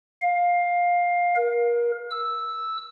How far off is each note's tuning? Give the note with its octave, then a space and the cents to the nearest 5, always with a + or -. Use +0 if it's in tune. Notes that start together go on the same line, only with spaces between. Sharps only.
F5 +15
A#4 +30
E6 -5